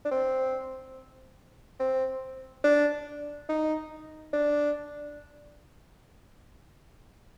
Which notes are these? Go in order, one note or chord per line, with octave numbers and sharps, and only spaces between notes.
D4
C4
C4
D4
D#4
D4